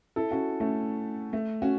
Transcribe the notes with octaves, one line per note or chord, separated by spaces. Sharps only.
E4 A4
C#4 F#4
A3 C#4
A3
C#4 F#4